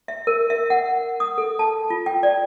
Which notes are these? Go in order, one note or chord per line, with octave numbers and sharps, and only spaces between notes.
E5
A#4
E5
F#5
D#6
A4
A5
F4
G5
D5